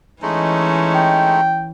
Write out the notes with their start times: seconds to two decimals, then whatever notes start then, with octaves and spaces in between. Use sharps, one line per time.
0.22 E3 G#3 A3 C#4 D#4
0.95 G5